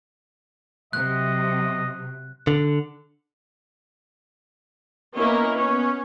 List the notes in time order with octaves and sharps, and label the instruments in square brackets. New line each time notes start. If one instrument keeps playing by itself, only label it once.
[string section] C3 F#3 [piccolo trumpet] D#5 [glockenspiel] F#6
[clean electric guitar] D3
[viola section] A#3 B3 C#4 E4 A#4 D#5
B3 C#4